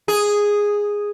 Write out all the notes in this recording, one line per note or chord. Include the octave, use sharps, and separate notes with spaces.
G#4